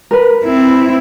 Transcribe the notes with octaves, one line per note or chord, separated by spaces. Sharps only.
A#4 B4
C4 E4